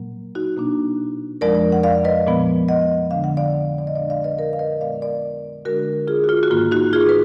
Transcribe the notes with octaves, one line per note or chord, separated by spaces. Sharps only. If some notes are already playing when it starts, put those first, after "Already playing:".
Already playing: A#2 F#3 A#3
D#4 F#4
B2 A#3 D4
F2 F3 G#3 D4 A#4 D5
F#5
D5 F5
B4 D#5
A#2 F3 G#3 B3
D#5 F#5
D3 G#3 D4 F5
F#5
D5 F5
D5
D#5
A#2 G#3 D4 D5 F5
D5 F5
B4 D#5
A#4 D5
F5
B4 D#5
A#2 G#3 B3 D5 F5
A#4 D5
D3 G#3 D4 F#4 A#4
F4 G#4
F#4
F4
F#4
G#2 D#3 A#3 F4
D#4 F#4
F4 G#4
B4